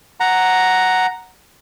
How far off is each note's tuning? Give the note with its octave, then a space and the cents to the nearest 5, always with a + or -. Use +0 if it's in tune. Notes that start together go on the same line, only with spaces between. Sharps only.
F#5 +0 A#5 +0